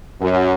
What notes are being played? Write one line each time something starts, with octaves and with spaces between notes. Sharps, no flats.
F#2